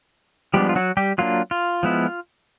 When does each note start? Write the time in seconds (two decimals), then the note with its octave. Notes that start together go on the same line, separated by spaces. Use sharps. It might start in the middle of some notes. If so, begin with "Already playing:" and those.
0.54 F3 G3 G#3 B3 D4 G4
0.69 F4
0.76 F#3 F#4
0.97 G3 G4
1.18 F#3 A#3 D4 F4
1.51 F4
1.83 F3 G#3 B3 E4